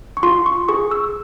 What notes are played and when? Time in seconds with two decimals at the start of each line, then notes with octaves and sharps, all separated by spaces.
0.17 C#6
0.23 F4 C6
0.46 C#6
0.69 G#4 C#6
0.91 E6